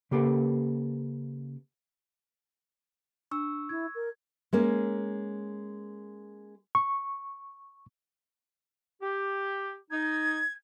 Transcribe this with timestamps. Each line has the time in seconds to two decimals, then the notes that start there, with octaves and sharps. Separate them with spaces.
0.11 C#3 A#3 G4 A4 B4
3.31 D4 C#6 E6
3.69 E4 G#6
3.95 A#4
4.53 G#3 A#3 C#4
6.75 C#6
9.02 G4
9.91 D#4 G#6